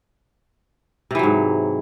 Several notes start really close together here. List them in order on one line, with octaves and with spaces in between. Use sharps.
C3 E3 F#3 G#2